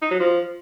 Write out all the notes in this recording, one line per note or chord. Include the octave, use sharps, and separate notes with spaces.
D#4
F#3
F3